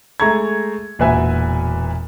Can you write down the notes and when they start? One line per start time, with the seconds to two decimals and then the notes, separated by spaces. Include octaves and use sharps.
0.20 G#3 A3 A#5 C#6 G#6
0.99 E1 A#2 F#4 B4 E5 G#5